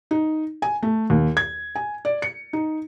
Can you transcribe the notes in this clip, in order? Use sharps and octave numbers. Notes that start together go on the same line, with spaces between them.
D#4
G#5
A3
D#2
G#6
G#5
D5
C#7
D#4